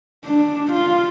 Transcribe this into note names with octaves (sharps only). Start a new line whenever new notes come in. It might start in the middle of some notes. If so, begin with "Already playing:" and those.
D4
F4